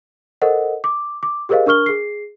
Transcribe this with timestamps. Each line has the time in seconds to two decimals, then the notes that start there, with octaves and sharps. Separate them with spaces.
0.42 A4 A#4 C5 D#5 F#5
0.84 D6
1.23 D6
1.49 G4 G#4 A#4 C5 D#5 F5
1.66 D4 A#4 C#6 F6 G7
1.86 G#4 C7